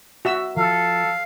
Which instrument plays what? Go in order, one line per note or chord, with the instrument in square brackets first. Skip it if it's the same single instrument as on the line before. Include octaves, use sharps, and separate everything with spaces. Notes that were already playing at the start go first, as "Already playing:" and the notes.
[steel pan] F#4 E5 E6
[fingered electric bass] F3 [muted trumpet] A4 [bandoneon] F5